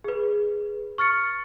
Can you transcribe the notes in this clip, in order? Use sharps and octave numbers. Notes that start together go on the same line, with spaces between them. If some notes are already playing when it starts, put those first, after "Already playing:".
G#4 B4
C#6 F6 A6 C#7